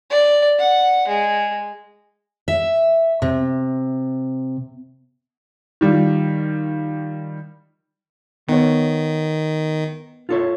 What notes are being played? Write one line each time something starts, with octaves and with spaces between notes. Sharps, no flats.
D5
F#5
G#3
E5
C3
D#3 G3 F4
D#3 B3 C#5
F4 A4 C#5